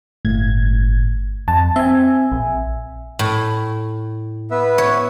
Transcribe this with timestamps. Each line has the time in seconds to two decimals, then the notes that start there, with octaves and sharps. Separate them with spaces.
0.25 G1 A2 G#6
1.48 F2 A5
1.76 C4 E5 G#5
2.32 A#1
3.19 A2
4.51 B3 B4 E5
4.78 C#5